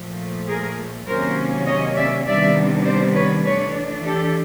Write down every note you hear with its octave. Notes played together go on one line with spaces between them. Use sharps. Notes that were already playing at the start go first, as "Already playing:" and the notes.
Already playing: A#2 F3 A3
G#4 A#4
C3 D#3 F#3 A#3 C#4 A#4 C5
C#5 D#5
D5 E5
C3 D#3 G3 B3 D4 D5 E5
C5 D5
B4 C#5
E3 A3 D4 B4 C#5
G4 A4